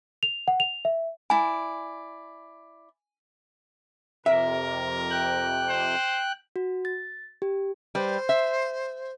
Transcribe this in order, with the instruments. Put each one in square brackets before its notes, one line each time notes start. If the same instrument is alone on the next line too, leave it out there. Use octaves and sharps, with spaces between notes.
[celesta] F7
F#5
F7
E5
[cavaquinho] E4 D5 [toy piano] G#5
[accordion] F2 C3 [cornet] A#4 [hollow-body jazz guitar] E5
[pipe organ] G5 F#6
[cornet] C5
[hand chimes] F#4
A6
G4
[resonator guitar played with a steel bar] G3 B4 [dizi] C5
[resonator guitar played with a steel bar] E5